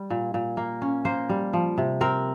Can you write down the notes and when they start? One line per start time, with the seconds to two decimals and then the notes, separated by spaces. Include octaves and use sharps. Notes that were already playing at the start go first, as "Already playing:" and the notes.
Already playing: G3
0.10 A#2
0.34 A#2
0.57 A#3
0.82 C#4
1.05 A#3 C5
1.29 G3
1.53 F3
1.78 C3
2.01 C4 A#4